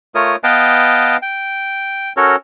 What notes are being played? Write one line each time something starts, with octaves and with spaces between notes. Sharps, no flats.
A3 F4 A#4 C#5 D#6
B3 B4 D#5 F5 G5 A5
G5
C#4 F#4 A4 A#4 C#5